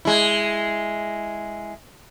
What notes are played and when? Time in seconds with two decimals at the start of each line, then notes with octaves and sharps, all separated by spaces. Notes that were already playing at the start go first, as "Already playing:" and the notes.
0.05 G#3 E4